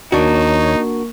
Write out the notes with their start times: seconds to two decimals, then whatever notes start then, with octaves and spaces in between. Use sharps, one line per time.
0.12 D#2 A#3 D4 D#4 F#4 A#4 C#5 C#6